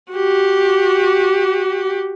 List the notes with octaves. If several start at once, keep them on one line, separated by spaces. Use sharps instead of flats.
F#4 G4